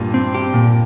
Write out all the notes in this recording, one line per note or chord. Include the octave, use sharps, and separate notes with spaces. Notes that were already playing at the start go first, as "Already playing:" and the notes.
Already playing: G2 A#2
C4
G4
A#2